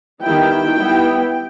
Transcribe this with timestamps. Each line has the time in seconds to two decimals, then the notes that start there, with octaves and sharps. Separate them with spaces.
0.23 D#3 G3 B3 E4 G5
0.78 G3 B3 E4